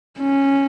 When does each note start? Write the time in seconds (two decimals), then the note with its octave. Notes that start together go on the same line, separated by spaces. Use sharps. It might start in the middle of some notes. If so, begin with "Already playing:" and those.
0.19 C#4